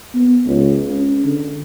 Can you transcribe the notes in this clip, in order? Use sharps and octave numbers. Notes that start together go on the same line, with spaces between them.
B3
C#2
C#4
D3